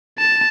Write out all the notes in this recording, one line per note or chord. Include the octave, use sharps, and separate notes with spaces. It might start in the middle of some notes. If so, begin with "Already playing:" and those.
A5